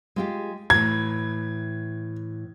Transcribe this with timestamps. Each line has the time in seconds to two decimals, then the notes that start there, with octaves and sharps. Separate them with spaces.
0.16 G#3 F4 G4
0.70 A2 E3 G#6